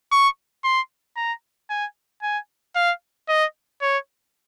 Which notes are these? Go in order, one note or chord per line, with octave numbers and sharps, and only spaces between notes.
C#6
C6
A#5
G#5
G#5
F5
D#5
C#5